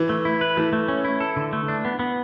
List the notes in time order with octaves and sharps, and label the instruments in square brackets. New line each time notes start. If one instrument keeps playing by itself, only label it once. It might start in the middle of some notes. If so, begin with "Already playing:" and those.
Already playing: [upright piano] E3
[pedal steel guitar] A3
E4
B4
[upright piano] E3 [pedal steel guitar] A3
[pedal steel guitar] A3
C#4
E4
A4
D3
A3
D4
B3
B3